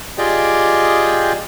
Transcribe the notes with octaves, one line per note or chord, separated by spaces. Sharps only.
F4 G4 G#4 D5 D#5 G5